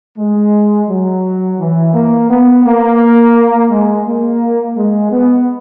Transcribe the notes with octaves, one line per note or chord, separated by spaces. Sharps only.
G#3
F#3
E3
A#3
B3
A#3
G#3
A#3
G#3
B3